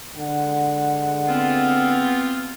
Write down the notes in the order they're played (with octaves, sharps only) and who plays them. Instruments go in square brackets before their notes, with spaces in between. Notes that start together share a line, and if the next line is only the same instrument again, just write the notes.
[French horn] D3 [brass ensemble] G#3 F#5
[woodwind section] B3 C4 F4